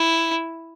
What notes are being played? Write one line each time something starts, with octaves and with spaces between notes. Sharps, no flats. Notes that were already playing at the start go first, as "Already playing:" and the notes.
Already playing: E4